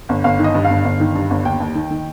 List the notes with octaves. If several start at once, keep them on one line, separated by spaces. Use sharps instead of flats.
G1
G1 F5
D#3
D#5
G2
G1 F5
G1
D#3
G2
G1
D#2 G5
D#2
D#3
D#3